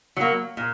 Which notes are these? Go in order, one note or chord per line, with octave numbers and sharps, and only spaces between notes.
F#3 A#3
A#2